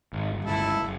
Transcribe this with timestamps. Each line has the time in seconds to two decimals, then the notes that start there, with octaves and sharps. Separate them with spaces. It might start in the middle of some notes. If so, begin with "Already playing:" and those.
0.13 G#1
0.33 G1
0.45 G1 C#2 A2 E4 A4
0.83 F#1